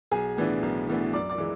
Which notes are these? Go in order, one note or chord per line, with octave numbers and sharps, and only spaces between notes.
B1 G#4 G#5
A2 E3 B3 D4
B1
A2 E3 B3 D4
F#2 D5 D6
D5 D6
E3 G#3